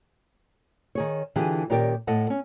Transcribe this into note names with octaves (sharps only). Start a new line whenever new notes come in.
D#3 G#4 C#5
D3 E3 F4 G4 G#4
A#2 D#3 C#4 G4 A#4 D5
A2 A4 D#5 F#5 A5
C#4